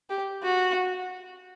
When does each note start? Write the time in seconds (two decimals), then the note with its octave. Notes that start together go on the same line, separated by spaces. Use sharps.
0.10 G4
0.43 F#4